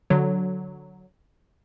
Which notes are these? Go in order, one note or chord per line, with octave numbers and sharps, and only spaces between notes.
D3 F#3